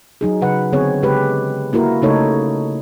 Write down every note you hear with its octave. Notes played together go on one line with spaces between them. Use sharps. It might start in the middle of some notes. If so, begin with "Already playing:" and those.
F#3 D#4 G#4
C#3 F#3 B4 F#5
D3 B3 C4 G#4 C#5
C#3 G#3 G4 B4
A#3 E4 F#4 A#4
C#3 A3 D#4 A4 C#5